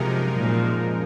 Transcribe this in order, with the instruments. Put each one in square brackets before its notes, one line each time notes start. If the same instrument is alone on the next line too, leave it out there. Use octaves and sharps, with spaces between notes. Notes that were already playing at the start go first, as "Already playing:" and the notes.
Already playing: [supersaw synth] F#2 F3 G#3 D#4 A#4 [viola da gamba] C3
[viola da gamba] A#2